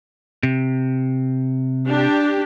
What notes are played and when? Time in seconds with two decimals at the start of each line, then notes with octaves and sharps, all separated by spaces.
0.43 C3
1.88 D4 G4